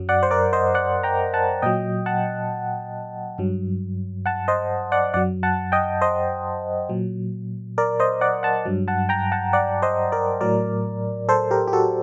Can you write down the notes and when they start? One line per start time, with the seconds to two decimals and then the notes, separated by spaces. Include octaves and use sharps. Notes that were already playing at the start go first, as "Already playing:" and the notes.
Already playing: F#2 F#3
0.09 D5 F#5
0.23 C5
0.31 A#4 D5
0.53 C5 D#5
0.74 D5 F#5
1.03 G5 A#5
1.34 F#5 A5
1.62 A#2 F#3 D#5 G5
2.06 F#5 A5
3.38 G2 F#3
4.26 F#5 A5
4.48 C5 D#5
4.92 D5 F#5
5.14 F#2 F#3 D5 F#5
5.43 F#5 A5
5.72 D#5 G5
6.02 C5 D#5
6.89 A#2 F#3
7.78 A#4 D5
8.00 C5 D#5
8.21 D5 F#5
8.43 F#5 A5
8.65 G2 F#3
8.88 F#5 A5
9.09 G5 A#5
9.32 F#5 A5
9.53 D5 F#5
9.82 C5 D#5
10.12 A#4 D5
10.41 A2 F#3 A#4 D5
11.29 A4 C5
11.51 G4 A#4
11.68 G4
11.73 F#4 A4